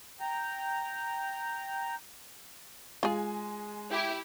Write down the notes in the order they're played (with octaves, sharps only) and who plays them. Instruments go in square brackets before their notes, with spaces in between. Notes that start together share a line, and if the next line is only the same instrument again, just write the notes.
[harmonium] G5 A#5
[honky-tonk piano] G#3 G#5 [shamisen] F4 G#4
[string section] E4 G4